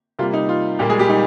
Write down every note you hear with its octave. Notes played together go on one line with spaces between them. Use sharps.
C3 G3 A#3 F4
D#4
F4
A#2 G3 A#3 G4
G#3 G#4
G3 G4
D#4